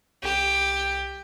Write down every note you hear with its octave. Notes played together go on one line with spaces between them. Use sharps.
C2 G4